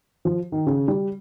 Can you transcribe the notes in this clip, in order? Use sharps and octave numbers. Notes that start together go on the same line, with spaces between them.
F3
D#3
C#3
G3